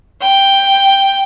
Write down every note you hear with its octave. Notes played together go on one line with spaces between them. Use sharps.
G5